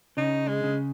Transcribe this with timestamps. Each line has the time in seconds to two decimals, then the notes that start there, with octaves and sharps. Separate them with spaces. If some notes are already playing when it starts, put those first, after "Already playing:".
0.17 C#3 D#4
0.48 G#3
0.64 C#3